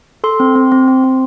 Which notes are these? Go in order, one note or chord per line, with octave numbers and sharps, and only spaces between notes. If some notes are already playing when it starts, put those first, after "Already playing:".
A4 C6
C4
C4
C4
C4
C4